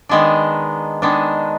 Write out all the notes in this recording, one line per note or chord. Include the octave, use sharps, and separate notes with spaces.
D#3 G#3 B3 D4
D#3 G#3 B3 D4